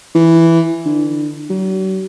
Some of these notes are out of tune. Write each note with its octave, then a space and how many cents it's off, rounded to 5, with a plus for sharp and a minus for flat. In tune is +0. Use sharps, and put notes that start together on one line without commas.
E3 +5
D3 +20
F#3 +40